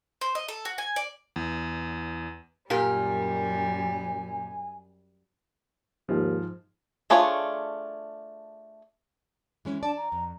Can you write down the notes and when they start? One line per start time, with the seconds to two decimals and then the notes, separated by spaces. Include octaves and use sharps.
0.21 C5
0.35 D#5
0.48 A4
0.65 F#4
0.78 G#5
0.96 D5
1.36 E2
2.70 F#2 A#2 G3 G4 A#4 G#5
6.09 D#2 G#2 F3
7.10 A3 D4 F4 G#4 C#5
9.65 E3 G#3 C#4
9.83 D4 D5 A5
9.96 A#5
10.12 F2